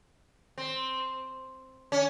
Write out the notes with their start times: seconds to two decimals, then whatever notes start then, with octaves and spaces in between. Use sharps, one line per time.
0.58 C4
1.92 C#4